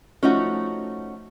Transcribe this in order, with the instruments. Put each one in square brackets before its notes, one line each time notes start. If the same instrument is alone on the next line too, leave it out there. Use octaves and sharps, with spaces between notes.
[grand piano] F3 A3 [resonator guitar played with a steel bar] C#4 D#4 F#4